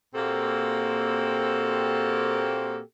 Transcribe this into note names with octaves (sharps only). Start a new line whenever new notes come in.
A#2 A#3 C4 F#4 G4 A4